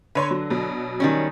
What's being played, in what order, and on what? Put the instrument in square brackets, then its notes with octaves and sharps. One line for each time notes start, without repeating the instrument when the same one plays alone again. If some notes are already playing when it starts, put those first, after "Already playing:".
[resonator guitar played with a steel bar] D3 [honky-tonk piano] B4 C#5 C6
[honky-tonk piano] F#3
B2 F#3
[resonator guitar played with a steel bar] D#3 G3 C#4